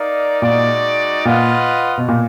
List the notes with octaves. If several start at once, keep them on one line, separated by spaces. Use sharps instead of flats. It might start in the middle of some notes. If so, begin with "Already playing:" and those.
Already playing: D#4 A#4 D5 F5
A#2 G#3 D#4 F#4 D5
A#2 F4 B4 D#5 F#5
B2
A#2